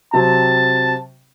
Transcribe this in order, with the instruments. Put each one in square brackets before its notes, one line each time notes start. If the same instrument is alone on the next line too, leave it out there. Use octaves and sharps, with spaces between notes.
[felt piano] C3 F#3 C4 [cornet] A5